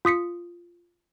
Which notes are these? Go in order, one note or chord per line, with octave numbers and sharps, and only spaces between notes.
F4 D#6 B6 C#7